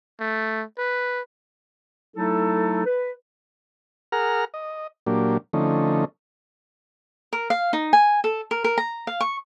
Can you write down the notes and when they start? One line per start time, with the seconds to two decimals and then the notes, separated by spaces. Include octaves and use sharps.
0.20 A3
0.78 B4
2.16 F#3 A3 D#4 E4 A4
2.86 B4
4.12 G#4 A#4 F#5 A#5 F6
4.54 D#5
5.07 A#2 F#3 A#3 D4 G4
5.53 D3 F3 A3 C#4 D#4
7.33 A#4
7.50 F5
7.73 D#4
7.93 G#5
8.24 A4
8.51 A#4
8.64 A#4
8.78 A#5
9.07 F5
9.21 C#6